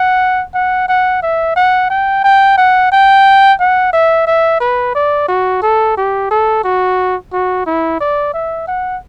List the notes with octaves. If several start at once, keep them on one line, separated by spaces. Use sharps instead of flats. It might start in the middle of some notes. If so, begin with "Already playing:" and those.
Already playing: F#5
F#5
F#5
E5
F#5
G5
G5
F#5
G5
F#5
E5
E5
B4
D5
F#4
A4
G4
A4
F#4
F#4
E4
D5
E5
F#5